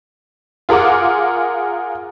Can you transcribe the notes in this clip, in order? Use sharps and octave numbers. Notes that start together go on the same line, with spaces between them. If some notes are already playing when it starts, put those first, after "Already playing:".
F4 G#4 A#4 F#5 D6